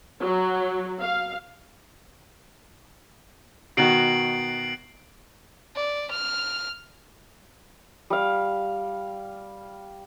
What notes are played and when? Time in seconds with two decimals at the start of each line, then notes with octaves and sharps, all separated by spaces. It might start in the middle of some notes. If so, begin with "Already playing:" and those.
0.22 F#3
1.01 F5
3.77 B2 D#3 F#4 C7 D7 F#7
5.76 D5
6.11 F6
8.10 G3 F5